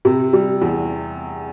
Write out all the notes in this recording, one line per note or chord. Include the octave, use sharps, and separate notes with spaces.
C3
G3
E2